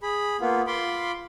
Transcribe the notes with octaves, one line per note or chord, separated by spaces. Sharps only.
G#4 B5
A#3 B3 F4
F4 B5 C6 D6